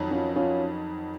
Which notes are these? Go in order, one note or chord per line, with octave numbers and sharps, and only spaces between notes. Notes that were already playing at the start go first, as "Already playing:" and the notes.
Already playing: F2 D#3 F#3 F#4
C#4 F4
C#4 F4